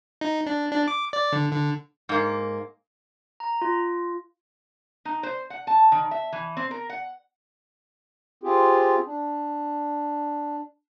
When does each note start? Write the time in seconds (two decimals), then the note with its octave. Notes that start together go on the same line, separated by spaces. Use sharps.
0.21 D#4
0.46 D4
0.71 D4
0.88 D6
1.13 D5
1.32 D3
1.52 D3
2.09 G#2 A#3
3.40 A#5
3.62 F4
5.05 D#4
5.23 C5
5.50 F#5
5.67 A5
5.92 D#3
6.11 E5
6.32 E3
6.57 C4
6.71 A#4
6.90 F#5
8.43 C4 F4 G4 G#4
9.06 D4